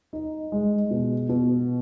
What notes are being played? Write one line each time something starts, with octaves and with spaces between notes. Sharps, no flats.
D#4
G#3
B2
B2